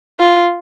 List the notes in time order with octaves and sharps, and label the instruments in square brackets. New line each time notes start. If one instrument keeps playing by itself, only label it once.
[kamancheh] F4